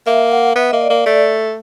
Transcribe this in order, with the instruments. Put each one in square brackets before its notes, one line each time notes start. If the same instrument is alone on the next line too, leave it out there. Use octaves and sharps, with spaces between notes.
[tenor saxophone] A#3 [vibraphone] E5
[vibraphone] F#5
[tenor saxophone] B3 [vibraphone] E5
[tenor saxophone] A#3 [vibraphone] D#5
[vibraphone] D5
[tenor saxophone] A#3
[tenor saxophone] A3 [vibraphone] D5